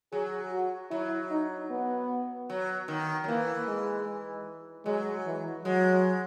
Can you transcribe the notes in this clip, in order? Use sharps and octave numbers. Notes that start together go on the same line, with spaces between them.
F#3 G#4
F#4
F#3 E4
D#4
B3
F#3
D#3
F#3
E3 A#3
G#3
F#3 G#3
E3
F#3 G#3